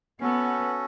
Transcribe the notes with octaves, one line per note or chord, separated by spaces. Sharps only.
B3 C#4 F#4 A4